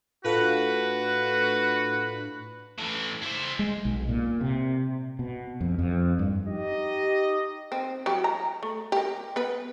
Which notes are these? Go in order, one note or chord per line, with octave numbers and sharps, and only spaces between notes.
A2 D4 F4 F#4 A4 B4 F5 F#6
A2 E3
E4 C5
G#3
B1
A#2
C3
B2
F2
F2
G2
D#4 G4 D#5
C4
F#3 E4 G4
A#5
A3
G4 A#4
B3 B4